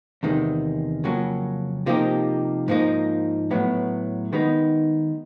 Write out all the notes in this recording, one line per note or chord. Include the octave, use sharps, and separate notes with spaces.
E2 C3 D#3 G#3
F2 C#3 F#3 A#3
C3 F3 A#3 D#4 G4
G#2 F3 A#3 D#4
A2 F#3 B3
D#3 G#3 B3 D#4